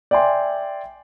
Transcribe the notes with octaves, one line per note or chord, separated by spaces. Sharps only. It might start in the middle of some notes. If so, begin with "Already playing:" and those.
D5 E5 G5 G#5 C6